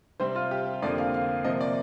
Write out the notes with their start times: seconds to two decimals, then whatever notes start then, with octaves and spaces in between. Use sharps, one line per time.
0.20 C3 G3 C4 C5
0.35 F4
0.51 G4
0.82 F2 D3 F3 A#3 D5
0.98 F5
1.14 F5
1.44 C3 F3 A#3 D#5
1.61 D5